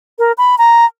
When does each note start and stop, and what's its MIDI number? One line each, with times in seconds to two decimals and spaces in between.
0.19 0.32 70
0.38 0.58 83
0.58 0.85 82